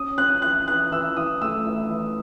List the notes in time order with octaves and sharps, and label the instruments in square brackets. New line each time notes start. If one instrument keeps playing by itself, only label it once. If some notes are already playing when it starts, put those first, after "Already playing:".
Already playing: [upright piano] C#4 D#6
C#4 F#6
E3 F#6
E3 F#6
E3 E6
E3 D#6
A3 E6
E3
E3